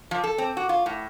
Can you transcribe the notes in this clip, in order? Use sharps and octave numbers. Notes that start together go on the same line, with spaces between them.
F3
A4
C4
F#4
F4
A2